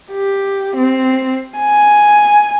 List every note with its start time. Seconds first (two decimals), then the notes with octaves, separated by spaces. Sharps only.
0.12 G4
0.77 C4
1.58 G#5